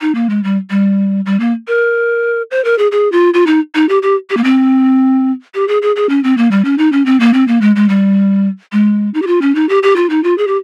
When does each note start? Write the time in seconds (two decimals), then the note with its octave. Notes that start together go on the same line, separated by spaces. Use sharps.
0.01 D#4
0.15 A#3
0.29 G#3
0.44 G3
0.70 G3
1.26 G3
1.40 A#3
1.68 A#4
2.51 C5
2.65 A#4
2.78 G#4
2.92 G#4
3.12 F4
3.34 F4
3.46 D#4
3.75 D#4
3.89 G4
4.02 G4
4.30 G4
4.37 A#3
4.44 C4
5.54 G4
5.68 G#4
5.82 G#4
5.96 G#4
6.09 C#4
6.24 C4
6.37 A#3
6.51 G3
6.65 C#4
6.78 D#4
6.92 C#4
7.06 C4
7.20 A#3
7.34 C4
7.48 A#3
7.61 G#3
7.76 G#3
7.89 G3
8.72 G#3
9.14 D#4
9.22 G4
9.27 F4
9.41 C#4
9.55 D#4
9.69 G4
9.83 G4
9.96 F4
10.10 D#4
10.24 F4
10.38 G#4
10.47 G4